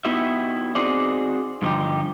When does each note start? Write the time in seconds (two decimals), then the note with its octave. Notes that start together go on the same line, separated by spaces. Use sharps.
0.05 B3 D#4 E4 F#4 G4 E5
0.75 C4 D#4 F#4 G#4 C5 D5
1.62 G2 D3 F3 D#4 G4